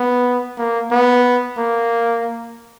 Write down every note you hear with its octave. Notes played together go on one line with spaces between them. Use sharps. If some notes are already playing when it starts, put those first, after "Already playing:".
Already playing: B3
A#3
B3
A#3